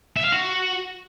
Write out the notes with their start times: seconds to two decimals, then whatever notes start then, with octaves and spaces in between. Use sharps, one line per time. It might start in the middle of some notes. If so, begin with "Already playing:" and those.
0.17 E5
0.24 F5
0.32 F#4